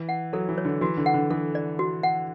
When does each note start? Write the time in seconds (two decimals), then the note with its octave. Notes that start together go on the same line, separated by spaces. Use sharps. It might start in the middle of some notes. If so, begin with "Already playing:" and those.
Already playing: E3
0.09 F#5
0.33 F#3 A4
0.49 E3
0.58 C#5
0.65 D3
0.81 E3 F#4
0.97 D3
1.06 F#5
1.14 D3
1.30 E3 A4
1.55 D5
1.79 F#4
2.03 F#5